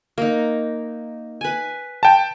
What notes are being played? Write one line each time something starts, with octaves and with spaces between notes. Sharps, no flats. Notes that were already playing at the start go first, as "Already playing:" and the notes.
A#3 D#4
B4 G#5
G5 A5